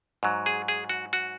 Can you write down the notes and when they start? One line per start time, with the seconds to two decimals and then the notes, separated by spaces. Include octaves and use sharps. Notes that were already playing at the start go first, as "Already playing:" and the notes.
0.23 G#2 F#3
0.46 G#4
0.68 G#4
0.89 F#4
1.13 F#4